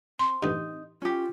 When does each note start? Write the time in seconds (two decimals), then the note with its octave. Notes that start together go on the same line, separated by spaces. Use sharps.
0.19 C4 C6
0.43 A1 G2 D#4
1.02 C#4 F4 G4